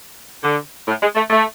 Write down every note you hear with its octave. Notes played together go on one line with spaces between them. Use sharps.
D3
A2
G#3
A3
A3